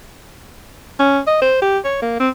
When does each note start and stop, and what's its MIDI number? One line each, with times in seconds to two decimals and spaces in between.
1.00 1.19 61
1.27 1.37 75
1.42 1.62 72
1.62 1.78 67
1.85 1.97 73
2.02 2.17 58
2.20 2.29 60